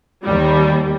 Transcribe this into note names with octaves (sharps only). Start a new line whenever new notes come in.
D#2 G3